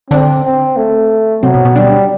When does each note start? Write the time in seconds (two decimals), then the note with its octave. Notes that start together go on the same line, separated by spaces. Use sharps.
0.11 D3 C4 D4
0.45 C4
0.77 A3
1.43 C3 F#3 C4
1.54 B2 B3
1.65 B2 B3
1.76 D3 G3 D4